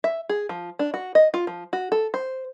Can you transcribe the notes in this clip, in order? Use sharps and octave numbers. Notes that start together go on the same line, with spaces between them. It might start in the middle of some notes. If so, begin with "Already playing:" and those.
E5
G#4
F3
D4
F#4
D#5
F4
F3
F#4
A4
C5